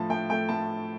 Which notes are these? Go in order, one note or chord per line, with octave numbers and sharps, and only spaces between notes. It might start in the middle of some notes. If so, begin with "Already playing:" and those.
Already playing: A2 F3 A5
A2 G5
A3 G5
A2 A5